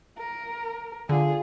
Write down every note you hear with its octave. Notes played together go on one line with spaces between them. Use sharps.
A#4
D3 F4 G#4